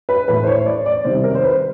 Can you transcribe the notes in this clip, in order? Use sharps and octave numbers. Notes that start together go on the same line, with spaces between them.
B4
A2 E3 A3 B4
C5
C#5
D5
D5
C3 D#3 G3 C5
A#4
C5
B4